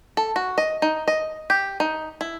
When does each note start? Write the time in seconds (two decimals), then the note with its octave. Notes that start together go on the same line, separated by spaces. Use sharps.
0.17 A4
0.36 F#4
0.58 D#5
0.82 D#4
1.08 D#5
1.50 G4
1.80 D#4
2.21 E4